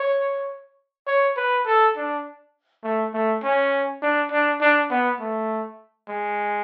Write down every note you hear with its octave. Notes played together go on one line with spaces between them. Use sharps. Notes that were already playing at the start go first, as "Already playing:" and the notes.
Already playing: C#5
C#5
B4
A4
D4
A3
A3
C#4
D4
D4
D4
B3
A3
G#3